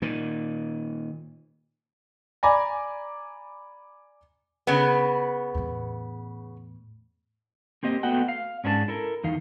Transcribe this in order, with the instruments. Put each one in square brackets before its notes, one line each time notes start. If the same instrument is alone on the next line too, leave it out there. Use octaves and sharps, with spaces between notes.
[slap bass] A#2 D#3
[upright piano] D5 G#5 A#5 B5 D6 A#6
[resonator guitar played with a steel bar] C#3 B3
[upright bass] E2 A2
[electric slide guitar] A#3 C4 G4 D#5
A3 B3 F#4 D#5 F#5 G5
F5
G#2 C#4 D4 A4 A5
E4 A4 A#4
E2 D#3 D#4 F5